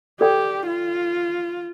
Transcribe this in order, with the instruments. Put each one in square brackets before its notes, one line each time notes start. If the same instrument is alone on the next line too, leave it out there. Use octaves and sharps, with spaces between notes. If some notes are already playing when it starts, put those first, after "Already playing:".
[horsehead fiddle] G4 [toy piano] A4 D5 G5
[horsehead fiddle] F4